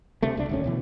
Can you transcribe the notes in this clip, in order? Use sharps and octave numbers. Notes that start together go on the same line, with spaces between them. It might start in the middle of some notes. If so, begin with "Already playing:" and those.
D2 C3 A3
C#2 D4
D#1 D2 C#4
D2 B2 E3